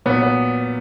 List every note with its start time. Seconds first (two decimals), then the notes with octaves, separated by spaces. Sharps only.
0.05 A#2 F#3 B3
0.22 B3